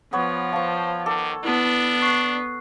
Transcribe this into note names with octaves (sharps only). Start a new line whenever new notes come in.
F3 B3 C#5
C5 F5 A5 C#6
D#3 A4 D6
B3 D4 E4
C#6 F#6 C7